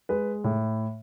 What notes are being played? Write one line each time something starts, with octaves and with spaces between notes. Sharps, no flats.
G#3 B4
A2